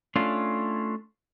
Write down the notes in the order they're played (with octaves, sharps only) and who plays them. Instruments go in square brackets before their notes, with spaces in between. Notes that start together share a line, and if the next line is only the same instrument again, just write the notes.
[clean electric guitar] A3 C#4 D4 F4